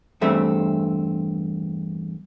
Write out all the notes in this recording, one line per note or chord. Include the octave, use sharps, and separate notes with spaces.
E2 G2 A3 C4 E5